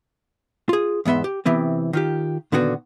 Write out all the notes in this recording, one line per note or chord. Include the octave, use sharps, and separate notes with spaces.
F4 G#4
E2 G#2 B3 E5 C6
G4
C3 E3 B3 C4
D#3 F4 G4
A#2 D3 D#3 B3 F#4